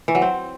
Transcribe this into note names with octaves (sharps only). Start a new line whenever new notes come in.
E3
F#3
C4